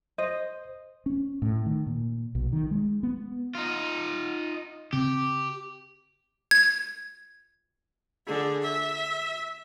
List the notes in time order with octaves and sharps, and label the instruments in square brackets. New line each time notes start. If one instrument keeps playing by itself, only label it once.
[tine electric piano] C5 [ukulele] D#5
[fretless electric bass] C#4
A2
D#3
A#2
B1
D#3
G#3
B3
[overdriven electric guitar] D#4 F4
[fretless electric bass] C#3 C4 [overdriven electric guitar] G4
[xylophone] G#6
[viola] D3 G#4
E5